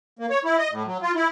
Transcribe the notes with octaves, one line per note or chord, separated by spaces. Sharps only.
A#3
C#5
E4
D#5
A2
F#3
F4
E4